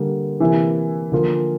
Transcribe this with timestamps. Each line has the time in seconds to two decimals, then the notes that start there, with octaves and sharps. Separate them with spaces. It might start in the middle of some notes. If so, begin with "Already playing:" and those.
Already playing: D3 G3 A#3
0.40 C3 E3 A#3 E4
1.12 D3 F3 A#3 F4